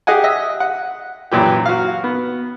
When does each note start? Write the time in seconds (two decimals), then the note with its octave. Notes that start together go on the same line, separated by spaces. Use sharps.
0.07 G4 G#4 D#5 F#5 G#5
0.24 D#5 E5
0.60 F#5
1.31 F#2 A#2 E3 G4
1.66 F#4 F5
2.04 B3